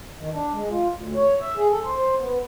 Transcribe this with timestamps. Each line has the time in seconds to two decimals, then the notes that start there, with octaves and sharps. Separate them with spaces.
0.18 D#3
0.33 D4
0.53 G#3
0.70 F4
0.96 D2
1.15 C#5
1.41 E5
1.57 G#4
1.70 A4
1.84 C5
1.97 C5
2.19 B3